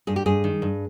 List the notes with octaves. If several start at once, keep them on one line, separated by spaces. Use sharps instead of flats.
G2 G#4
G4
G2 G#4
D#3
G2